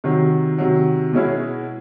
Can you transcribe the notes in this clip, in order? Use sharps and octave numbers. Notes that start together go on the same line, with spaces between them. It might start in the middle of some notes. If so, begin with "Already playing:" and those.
C3 D#3 F#3
C3 D#3 F#3
B2 G#3 C#4 E4 G#4